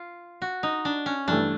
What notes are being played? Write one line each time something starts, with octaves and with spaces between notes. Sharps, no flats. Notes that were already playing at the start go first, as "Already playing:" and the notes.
Already playing: F4
F#4
D#4
D4
C#4
G2 E3 A3 D4